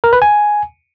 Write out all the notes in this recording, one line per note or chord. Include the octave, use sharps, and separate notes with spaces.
A#4
B4
G#5